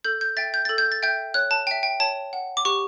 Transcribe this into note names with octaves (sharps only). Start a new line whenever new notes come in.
A4 G6
G6
E5 G5 A6
G6
A4 A6
G6
A6
E5 G5 G6
C#5 F#6
A5
E5 G5
G5
C#5 A5
F#5
D6
G4 C#6